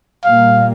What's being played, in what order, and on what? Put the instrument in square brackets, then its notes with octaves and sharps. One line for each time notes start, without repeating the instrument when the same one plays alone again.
[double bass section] A#2 G3 A#3 [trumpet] F5